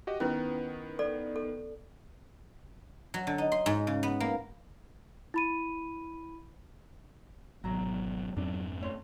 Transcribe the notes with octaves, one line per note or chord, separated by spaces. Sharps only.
F#4 G4 D#5
D#3 B3 C#4 E4 B4
A4 D5
A4
F#3
D3
D#4
C6
G#2
C#3
B3
A#3
E4 B5 D#7
G#1 B2 F#3 A#5
F2 G#2 F#3 C4 D4
A3 C#5 C6